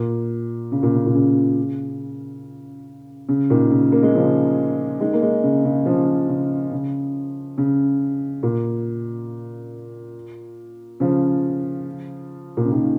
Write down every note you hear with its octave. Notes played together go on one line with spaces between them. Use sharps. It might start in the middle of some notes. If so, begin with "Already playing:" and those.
Already playing: A#2
C#3
A#2
C#3
A#2
C#3
C#3
A#2 D#3
C#3
A#3
G#3
C#3 F3
D#3 G#3
A#3
D#3 G#3
C#3
C#3
C#3 F3
C#3
C#3
C#3
A#2
C#3 F3
A#2
C#3
A#2 D#3